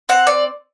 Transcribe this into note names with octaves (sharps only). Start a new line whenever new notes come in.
C4 F#5
D5